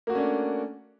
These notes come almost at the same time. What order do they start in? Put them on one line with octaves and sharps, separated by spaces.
A#3 F#4 A3 C#4 D4